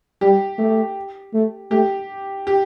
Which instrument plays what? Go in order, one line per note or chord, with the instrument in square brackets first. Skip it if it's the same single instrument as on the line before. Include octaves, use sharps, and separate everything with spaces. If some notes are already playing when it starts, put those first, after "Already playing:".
[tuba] G3 [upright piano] G4
[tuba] A3
A3
[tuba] A3 [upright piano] G4
[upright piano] G4